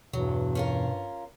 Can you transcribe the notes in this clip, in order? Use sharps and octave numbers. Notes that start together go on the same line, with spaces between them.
E2 G2 B2 F#3
C#4 F4 A#4